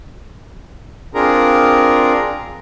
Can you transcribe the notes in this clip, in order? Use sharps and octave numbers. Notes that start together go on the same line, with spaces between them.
C4 D4 F4 G#4 A#4 A#5